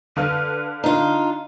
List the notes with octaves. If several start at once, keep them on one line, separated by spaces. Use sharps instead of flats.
D3 B4 F5 F6
D4 D#4 F4